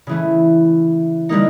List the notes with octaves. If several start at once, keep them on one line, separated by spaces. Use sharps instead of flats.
C#3 E3 A3
D3 G3 A#3 D#4